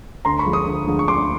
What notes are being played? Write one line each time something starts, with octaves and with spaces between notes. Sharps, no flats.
D2 A#5 C6
B5 C#6
D3 F3 G#3
C#6 D#6
D2
D3 F3 G#3
C#6
D2 C6 D6